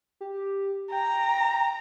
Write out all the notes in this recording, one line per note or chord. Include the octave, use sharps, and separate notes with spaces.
G4
G5 A#5